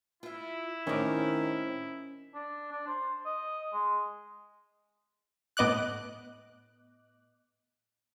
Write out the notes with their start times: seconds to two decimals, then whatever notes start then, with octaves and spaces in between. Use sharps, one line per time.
0.23 E4 F4 E5
0.87 A2 D#3 C4 C#4 D#5 D6
2.34 D4
2.72 D4
2.87 C5
3.25 D#5
3.73 G#3
5.57 A2 B3 D#5 D6 F#6